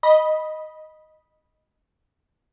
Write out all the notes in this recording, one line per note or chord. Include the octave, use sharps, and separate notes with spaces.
D#5 B5